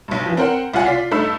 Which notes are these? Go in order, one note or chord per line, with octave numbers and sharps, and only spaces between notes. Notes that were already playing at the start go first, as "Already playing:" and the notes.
B1 G2
E3 F3
C4 A#4 C5 F#5
C2 F4 F5 F#5 G#5
F4 D5 B6 C7
G2 A3 D#4 B5 E6